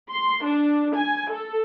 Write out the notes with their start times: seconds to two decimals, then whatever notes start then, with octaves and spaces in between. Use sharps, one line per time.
0.11 C6
0.45 D4
0.96 G#5
1.32 A4